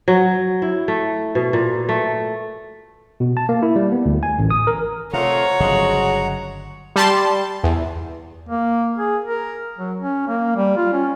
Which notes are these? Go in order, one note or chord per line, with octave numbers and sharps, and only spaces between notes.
F#3
E4
A3
B2
A#2
A3
B2
A5
A#3
E4
G3
B3
D2
G#5
A1
D#6
A#4
C3 A3 F4 C#5 F#5 A#5
G1 C#3 F3 F#3 G#3 F#4
G3 A5 C6
E2
A#3
G#4
A#4
F#3
C#4
A#3
G3
F4
C#4